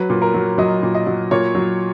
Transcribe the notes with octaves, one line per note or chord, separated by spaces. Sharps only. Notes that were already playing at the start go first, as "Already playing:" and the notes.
Already playing: F#3 B4
A#2
A#4
F#3
F#3 D#5
A#2
D#5
F#3
A#2 C#5
F#3